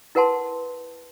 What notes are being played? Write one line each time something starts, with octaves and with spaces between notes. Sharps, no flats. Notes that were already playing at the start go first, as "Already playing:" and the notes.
E4 A#4 B4 F#5 A5 C6